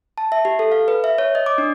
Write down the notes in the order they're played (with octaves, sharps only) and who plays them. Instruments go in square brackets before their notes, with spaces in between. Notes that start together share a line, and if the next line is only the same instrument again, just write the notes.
[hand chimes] A5
E5
G4
A4
F5
B4
E5
C#5
D#5
D6
D4